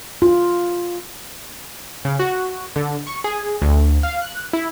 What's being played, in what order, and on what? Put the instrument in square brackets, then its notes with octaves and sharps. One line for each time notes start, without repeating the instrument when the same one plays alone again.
[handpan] F4
[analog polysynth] C#3
F#4
D3
C#6
G#4
D2
F5
F#6
E4